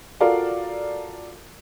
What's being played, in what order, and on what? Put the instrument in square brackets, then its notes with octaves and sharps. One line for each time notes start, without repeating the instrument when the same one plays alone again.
[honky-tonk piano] F4 F#4 A4 A#4 D5 F5